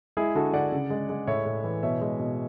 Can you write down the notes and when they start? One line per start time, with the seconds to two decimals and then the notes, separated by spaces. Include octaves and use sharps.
0.17 G#3 E4 G#4
0.35 D3 F#4 A4
0.53 D3 D5 F#5
0.72 C#3
0.90 G#3
1.09 G#3
1.27 A2 C#5 E5
1.46 A2
1.64 E3
1.83 B2 C#5 E5
2.01 G#3
2.20 B2